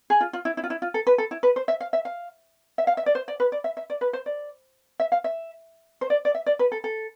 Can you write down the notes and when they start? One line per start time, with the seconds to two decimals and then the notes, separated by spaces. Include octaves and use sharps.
0.10 G#4
0.21 F4
0.33 F4
0.45 E4
0.57 E4
0.64 F4
0.70 E4
0.82 F4
0.94 A4
1.07 B4
1.18 A4
1.31 E4
1.43 B4
1.56 C5
1.68 E5
1.81 F5
1.93 E5
2.05 F5
2.78 E5
2.87 F5
2.97 E5
3.06 D5
3.15 C5
3.28 D5
3.40 B4
3.52 D5
3.64 E5
3.77 E5
3.90 D5
4.01 B4
4.13 C5
4.26 D5
5.00 E5
5.12 F5
5.24 E5
6.01 C5
6.10 D5
6.25 D5
6.35 E5
6.46 D5
6.59 B4
6.72 A4
6.84 A4